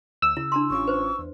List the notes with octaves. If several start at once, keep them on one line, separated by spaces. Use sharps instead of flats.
D2 E6
C#3 E4
D4 A#5 C6
A1 C#4 F4 C#6
B4 C5
E2